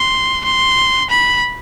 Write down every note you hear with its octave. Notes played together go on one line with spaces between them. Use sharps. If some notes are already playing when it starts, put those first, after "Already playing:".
Already playing: C6
C6
B5